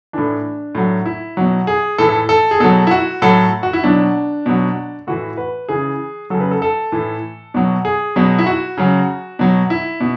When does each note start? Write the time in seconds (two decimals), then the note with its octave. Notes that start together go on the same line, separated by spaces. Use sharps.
0.13 A2 E3 D4
0.75 A2 F#3
1.06 E4
1.37 B2 F#3
1.67 G#4
1.98 A2 E3 A4
2.09 A4
2.29 A4
2.51 G#4
2.60 B2 F#3 A4
2.87 E4
2.91 F#4
3.22 A2 F#3 A4
3.63 F#4
3.73 E4
3.84 B2 F#3 D4
4.46 B2 F#3
5.07 A2 E3 F#4
5.37 B4
5.69 C#3 E3 G#4
6.30 C#3 F#3 A4
6.40 B4
6.51 A4
6.62 A4
6.92 A2 E3
7.54 B2 F#3
7.85 G#4
8.16 B2 F#3
8.39 E4
8.47 F#4
8.77 C#3 F#3
9.39 B2 F#3
9.70 E4
10.00 B2